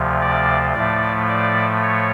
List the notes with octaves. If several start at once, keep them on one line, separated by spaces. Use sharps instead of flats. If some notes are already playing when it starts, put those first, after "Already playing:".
Already playing: D2 C3 F3
D5
A2 F3 A3 D5
D5
C#5